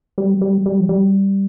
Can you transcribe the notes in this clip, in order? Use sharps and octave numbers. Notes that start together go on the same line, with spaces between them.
G3
G3
G3
F3
G3